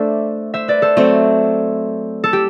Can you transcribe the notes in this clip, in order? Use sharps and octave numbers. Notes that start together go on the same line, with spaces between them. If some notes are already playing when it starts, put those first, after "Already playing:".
Already playing: A3 D4 C5 D5 E5
C5 E5
B4 D5
A4 C5
F#3 A3 C4
A4
G4